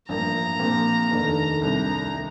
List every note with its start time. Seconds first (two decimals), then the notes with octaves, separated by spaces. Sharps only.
0.09 A1 G2 F3 A#3 D4 A#5
0.60 A#2 F3 C4 G4
1.10 F1 D#2 D#3 A3 D4
1.62 C2 C3 G3 D4 A#5
2.15 D#3